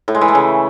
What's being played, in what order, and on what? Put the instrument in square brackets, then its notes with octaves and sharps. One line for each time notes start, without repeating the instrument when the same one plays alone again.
[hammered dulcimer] A2
G#3
E3
A3
C#3